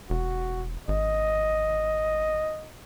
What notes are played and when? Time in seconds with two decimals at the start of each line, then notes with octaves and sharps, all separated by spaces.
0.10 E1 F#4
0.88 G#1 D#5